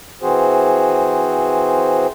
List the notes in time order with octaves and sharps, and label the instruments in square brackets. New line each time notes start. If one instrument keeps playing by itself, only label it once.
[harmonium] E3 C4 F#4 G#4 C5